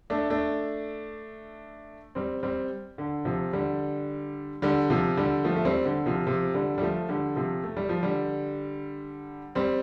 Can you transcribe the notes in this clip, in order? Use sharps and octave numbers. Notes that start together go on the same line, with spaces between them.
A3 D4
A3 D4
G3 C4
G3 C4
D3
C3 F3
D3 G3
D3 G3
C3 F3
D3 G3
F3 A3
A3
G3 C4
D3
C3 F3
C3 F3
D3 G3
G3
F3 A3
D3 G3
C3 F3
A3
G3
F3
D3 G3
G3 C4